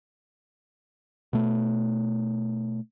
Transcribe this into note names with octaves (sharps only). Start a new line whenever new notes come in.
B2 A3